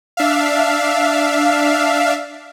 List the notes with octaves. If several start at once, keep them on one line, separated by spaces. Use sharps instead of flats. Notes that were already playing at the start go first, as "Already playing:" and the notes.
D4 E5 F5